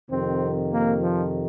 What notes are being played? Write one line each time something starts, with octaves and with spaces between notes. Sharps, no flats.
F2 C3 D#3 C4
A#3
F3